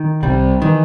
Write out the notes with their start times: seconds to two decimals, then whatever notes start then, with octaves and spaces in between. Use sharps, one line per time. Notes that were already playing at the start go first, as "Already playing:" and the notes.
Already playing: D#3
0.23 C2 C3 G3
0.62 D#3 E3